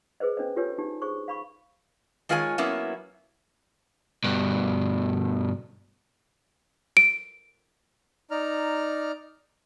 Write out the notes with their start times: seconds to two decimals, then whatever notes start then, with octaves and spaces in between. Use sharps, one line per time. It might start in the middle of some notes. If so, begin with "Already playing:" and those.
0.20 G#4 B4 C5 D#5
0.37 C#4 D4 C5 D#5
0.56 F4 G4 A4 B4 C#5 G#5
0.78 D4 D#4 G4
1.02 G#4 C5 C#6
1.28 F5 B5 C#6
2.29 D#3 G#3 F4 C#5 D#5 G#5
2.58 F#3 A#3 B3 C#4 E4
4.24 G2 B2
6.97 D7
8.31 D#4 D5 A#5 F6